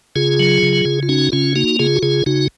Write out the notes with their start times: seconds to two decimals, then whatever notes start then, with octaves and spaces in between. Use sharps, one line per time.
0.15 C#3 F4 G#4
0.39 F#3
0.63 C#3
0.85 C#3
1.03 F4
1.09 C#4 D#4 F#4
1.32 C#3 C#4 F4
1.55 A#3 D#4 F#4
1.79 C#3 F4 G#4
1.96 F#4
2.03 C#3 F4 G#4
2.26 C#3 D#4 F#4